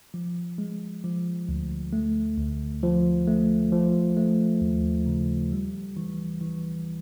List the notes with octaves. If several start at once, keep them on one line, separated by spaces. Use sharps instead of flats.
F3
G#3
F3
D2
A3
D2
F3
A3
F3
A3
D#2
C#3
G3
E3
E3